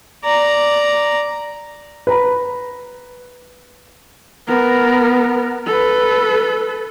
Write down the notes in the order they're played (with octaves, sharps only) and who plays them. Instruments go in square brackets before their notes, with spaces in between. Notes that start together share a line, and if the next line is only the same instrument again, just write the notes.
[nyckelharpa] D5 A#5
[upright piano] B4 A#5 B5
[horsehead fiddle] B3 A#4
A4 B4